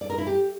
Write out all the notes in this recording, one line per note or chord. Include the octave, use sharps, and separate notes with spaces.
D5
A#4
E4
G4